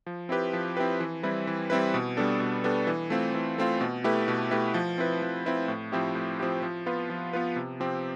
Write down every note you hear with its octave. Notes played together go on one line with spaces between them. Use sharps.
F3
C4 E4 G4 B4
F3
C4 E4 G4 B4
E3
G3 C4 E4 B4
E3
G3 C4 E4 B4
B2
G3 B3 D4 A4
B2
G3 B3 D4 A4
E3
A3 C4 F4
E3
A3 C4 F4
B2
A3 E4 G4 B4
B2
A3 E4 G4 B4
F3
C4 E4 B4
F3
C4 E4 B4
A2
F3 C4 E4 G4
A2
F3 C4 E4 G4
F3
B3 F4 B4
F3
B3 F4 B4
C3
F3 C4 G4